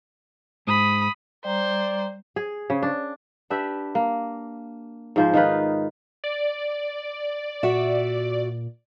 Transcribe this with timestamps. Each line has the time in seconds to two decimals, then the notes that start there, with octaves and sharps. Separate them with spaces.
0.67 G#2 B5 D#6
1.45 G3 C5 D5 A#5
2.36 G#4
2.70 C#3
2.83 D4
3.50 D4 G4 B4 E5
3.95 A#3
5.16 G#2 F3 C5
5.34 D#3 D#4 F4 B4
6.24 D5
7.63 A#2 F#4 E5